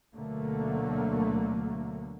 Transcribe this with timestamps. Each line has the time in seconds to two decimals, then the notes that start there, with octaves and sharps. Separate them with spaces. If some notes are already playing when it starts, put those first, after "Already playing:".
0.15 D2 B2 D3 F#3 A3 A#3